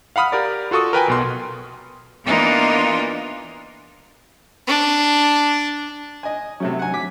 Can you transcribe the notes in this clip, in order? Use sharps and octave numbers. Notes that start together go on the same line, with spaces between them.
F5 F#5 B5 D#6 F6
G4 A#4 D5
F4 F#4 A4 C#6 D#6
A#4 B4 G5 G#5
B1 B2 C6
E3 A#3 B3 D4 D#4 F4
D4
D#5 G#5
C3 F#3 A3 C#4
F#5 G#5
D6 B6